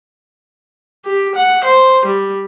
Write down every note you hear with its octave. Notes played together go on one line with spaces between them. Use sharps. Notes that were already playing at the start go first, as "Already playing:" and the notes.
G4
F#5
C5
G3